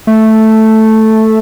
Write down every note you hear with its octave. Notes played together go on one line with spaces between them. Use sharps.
A3